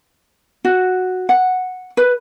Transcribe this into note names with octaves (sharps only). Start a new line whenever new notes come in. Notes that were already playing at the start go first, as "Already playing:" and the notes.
F#4
F#5
B4